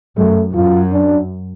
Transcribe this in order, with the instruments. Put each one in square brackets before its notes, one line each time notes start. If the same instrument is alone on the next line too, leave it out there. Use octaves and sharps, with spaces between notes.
[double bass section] F#2 [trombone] A3
[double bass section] F#2 [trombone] F4
[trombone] D4